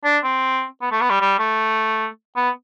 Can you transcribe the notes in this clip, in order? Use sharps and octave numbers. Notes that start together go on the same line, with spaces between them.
D4
C4
B3
A3
B3
G3
G3
A3
B3